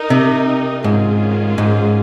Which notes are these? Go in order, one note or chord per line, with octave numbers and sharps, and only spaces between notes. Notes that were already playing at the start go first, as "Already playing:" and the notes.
Already playing: D#4 A#4 D#5
C3
G#2 D#3 G#3 C#4 F4 G#4
G#2